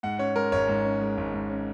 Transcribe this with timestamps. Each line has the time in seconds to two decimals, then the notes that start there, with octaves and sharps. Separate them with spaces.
0.03 G#2 F#5
0.19 C#4 C#5
0.36 G#3 A#4
0.52 G#1 C#5
0.68 G#2
0.85 C#4
1.01 G#3
1.18 G#1
1.33 G#2
1.50 C#4